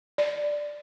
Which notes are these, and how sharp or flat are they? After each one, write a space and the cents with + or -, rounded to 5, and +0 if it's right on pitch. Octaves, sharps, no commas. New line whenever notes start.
D5 +5